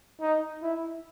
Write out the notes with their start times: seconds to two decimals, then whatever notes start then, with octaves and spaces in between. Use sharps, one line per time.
0.21 D#4
0.62 E4